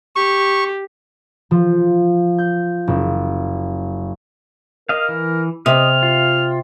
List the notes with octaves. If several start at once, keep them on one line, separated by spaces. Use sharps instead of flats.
G4 C#6
F3
G6
F#1
A#4 D#5 F5
E3
C3 D#5 F6
F4